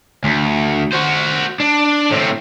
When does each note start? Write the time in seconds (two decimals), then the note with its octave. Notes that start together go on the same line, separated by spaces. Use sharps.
0.24 D2
0.92 F#4 C5
1.60 D4
2.11 A2 C4